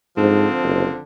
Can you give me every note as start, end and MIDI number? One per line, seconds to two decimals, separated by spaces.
0.17 0.47 44
0.17 1.01 50
0.17 1.01 53
0.17 1.01 60
0.63 0.87 30